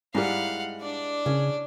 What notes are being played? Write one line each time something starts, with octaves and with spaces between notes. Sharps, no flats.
G#2 G3 G#3 E4 G4 F5 F#5
D4 D5
C#3 C#4 G#4